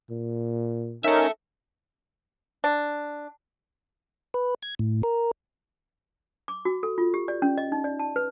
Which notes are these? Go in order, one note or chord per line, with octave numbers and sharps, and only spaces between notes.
A#2
C#4 D#4 A4 A#4 E5
D4
B4
G#6
A2
A#4
D6
F#4
A4
F4
G4
D5
C#4
D#5
D#4
D5
A5
B4